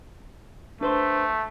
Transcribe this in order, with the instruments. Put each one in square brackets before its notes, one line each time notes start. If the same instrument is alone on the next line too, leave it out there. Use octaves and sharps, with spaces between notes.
[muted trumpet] A3 [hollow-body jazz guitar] D4 B4 C5